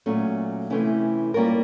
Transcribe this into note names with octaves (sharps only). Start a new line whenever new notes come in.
A#2 F#3 A3 C#4
C3 E3 A3 C#4 E4
G3 A#3 C#4 F4 A#4